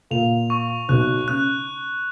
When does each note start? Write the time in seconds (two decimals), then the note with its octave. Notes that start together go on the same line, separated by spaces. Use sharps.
0.11 A#2 F7
0.50 C#6
0.89 B1 B2 F#6
1.27 C#3 F#6